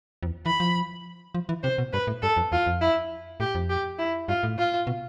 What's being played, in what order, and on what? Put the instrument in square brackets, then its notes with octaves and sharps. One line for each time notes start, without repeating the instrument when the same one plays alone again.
[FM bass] F2
E2
[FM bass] E3 [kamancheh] B5
[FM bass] F3
F3
E3
[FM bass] C3 [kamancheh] C5
[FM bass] B2
[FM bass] G2 [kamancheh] B4
[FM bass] A2
[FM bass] G2 [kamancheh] A4
[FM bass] F2
[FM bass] E2 [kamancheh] F4
[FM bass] F2
[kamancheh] E4
[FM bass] A2 [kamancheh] G4
[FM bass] F2
[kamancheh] G4
E4
[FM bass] G2 [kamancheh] F4
[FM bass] A2
[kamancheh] F4
[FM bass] B2